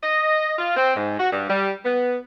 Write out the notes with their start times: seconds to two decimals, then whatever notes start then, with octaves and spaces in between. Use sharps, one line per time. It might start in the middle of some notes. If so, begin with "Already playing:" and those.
0.03 D#5
0.59 F4
0.76 C4
0.96 G#2
1.19 F#4
1.32 G2
1.49 G3
1.85 B3